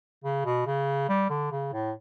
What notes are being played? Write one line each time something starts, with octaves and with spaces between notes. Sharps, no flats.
C#3
B2
C#3
G3
D3
C#3
A2